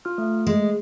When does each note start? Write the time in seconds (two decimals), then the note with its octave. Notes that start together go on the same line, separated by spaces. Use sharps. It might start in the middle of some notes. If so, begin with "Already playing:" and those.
0.05 F4 F6
0.18 A3
0.47 G#3